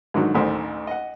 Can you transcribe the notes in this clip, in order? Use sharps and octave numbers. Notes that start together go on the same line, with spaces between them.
G#2 D3 D#3 F#3
A1 D2 D#3 C5
D#5 F#5